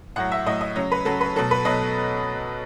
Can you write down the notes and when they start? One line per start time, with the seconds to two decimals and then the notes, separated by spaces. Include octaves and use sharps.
0.16 A2 F#3 F#5
0.32 E5
0.46 A2 F#3 D#5
0.61 D#5
0.76 C#3 F#3 C#5
0.92 B4
1.05 C#3 F#3 A4
1.21 B4
1.36 B2 F#3 A4
1.51 B4
1.65 B2 F#3 D#5